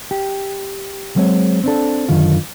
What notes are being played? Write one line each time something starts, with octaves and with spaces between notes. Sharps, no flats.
G4
F#3 G#3 C4 G#4 C#5
C4 D4 A4
F#2 D3 D#3 F4